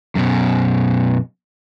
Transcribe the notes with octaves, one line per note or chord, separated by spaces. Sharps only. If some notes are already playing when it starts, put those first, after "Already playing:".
F#2 B2